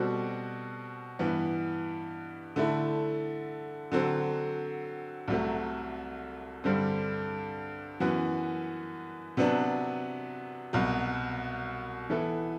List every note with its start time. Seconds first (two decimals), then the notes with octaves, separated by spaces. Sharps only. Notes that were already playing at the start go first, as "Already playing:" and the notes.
Already playing: B2 G3 C4 F#4 A4
1.19 G2 E3 B3
2.56 D3 A3 E4
3.92 D3 F#3 C4
5.28 C2 C3 F#3 A3
6.64 G2 D3 G3 C4
8.00 F#2 E3 B3 F#4
9.37 C3 F#3 B3 D4
10.73 C2 B2 F#3
12.10 E3 B3 E4 A4